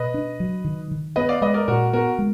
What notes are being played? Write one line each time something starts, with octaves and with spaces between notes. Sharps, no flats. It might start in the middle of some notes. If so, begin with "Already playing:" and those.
Already playing: B2 B4 D#5
D4
F#3
D#3
D#3
B3 B4 D#5
D5 F5
G#3 B4 D#5
A#4 D5
A#2 F#4 A#4
B3 F#4 A#4
G#3